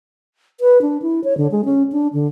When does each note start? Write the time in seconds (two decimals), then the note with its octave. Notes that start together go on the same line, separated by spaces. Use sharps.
0.60 B4
0.82 D4
1.02 E4
1.24 C#5
1.37 D3
1.51 G#3
1.65 C#4
1.92 D4
2.13 D3